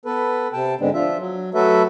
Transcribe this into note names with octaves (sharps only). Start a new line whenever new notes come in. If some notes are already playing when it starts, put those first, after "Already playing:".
B3 A4 B4
C3 G5 A5
G#2 D3 G#3 B3 C4 D4
F3 D4 F4 E5
F#3
F#3 A3 F#4 A4 B4 E5